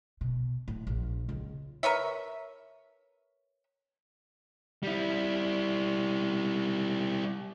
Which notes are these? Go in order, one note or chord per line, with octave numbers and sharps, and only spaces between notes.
B2
A2
A#1
C#2
A#4 B4 C#5 E5
G3 E4